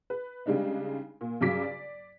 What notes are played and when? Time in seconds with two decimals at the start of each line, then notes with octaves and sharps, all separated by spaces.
0.10 B4
0.46 C#3 G3 G#3 D4 D#4
1.21 A#2
1.41 G2 C#3 F#3 D6 B6
1.63 D5